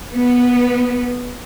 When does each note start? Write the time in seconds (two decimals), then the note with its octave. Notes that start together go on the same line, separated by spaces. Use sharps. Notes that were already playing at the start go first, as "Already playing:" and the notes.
0.14 B3